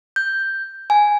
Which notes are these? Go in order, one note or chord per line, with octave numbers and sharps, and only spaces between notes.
G6
G#5